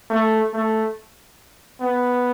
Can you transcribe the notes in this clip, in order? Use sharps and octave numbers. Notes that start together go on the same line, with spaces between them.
A3
A3
B3